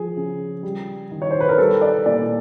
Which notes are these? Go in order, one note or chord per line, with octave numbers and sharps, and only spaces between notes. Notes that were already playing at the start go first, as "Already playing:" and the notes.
Already playing: F3 G#4
C#3
G3
D#3
C#5
C5
B4
A#4
G3 A4
D5
A#2 D5